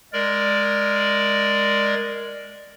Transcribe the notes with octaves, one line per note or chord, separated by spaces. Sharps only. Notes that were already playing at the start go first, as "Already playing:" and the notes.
G#3 A#4 D5